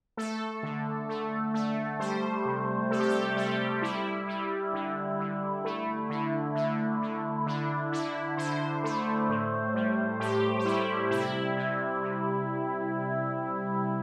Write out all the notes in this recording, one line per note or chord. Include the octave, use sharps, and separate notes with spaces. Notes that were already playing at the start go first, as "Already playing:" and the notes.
A3 A4
D3
A3
A3
G3 C5
C3
C3 A4
G4
A4
G3 G4
G3 E4
G3
D3
D3
A3
D3
D3
D3
D3 D4
D3 E4
D3 C5
A3
A2
G3
A2 G4
G4
G3 E4
C3 E4
C3
C3